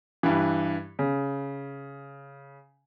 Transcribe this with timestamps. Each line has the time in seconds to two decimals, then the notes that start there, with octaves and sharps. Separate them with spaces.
0.23 G2 E3
0.99 C#3